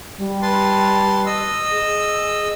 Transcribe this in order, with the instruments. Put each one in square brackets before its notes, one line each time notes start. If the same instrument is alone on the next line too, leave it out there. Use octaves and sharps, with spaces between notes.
[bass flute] G3
[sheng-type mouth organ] B4 A5 C6
D#5 E6
[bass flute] G#4